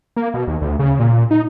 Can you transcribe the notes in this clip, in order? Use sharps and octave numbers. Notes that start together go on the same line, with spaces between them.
A#3
B2
D#2
D2
C#3
A#2
D#4